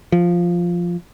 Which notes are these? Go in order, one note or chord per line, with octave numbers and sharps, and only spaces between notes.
F3